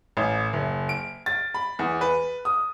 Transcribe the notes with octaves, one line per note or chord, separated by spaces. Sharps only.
A1
F#1
D7
A6
B5
E2
B4
D#6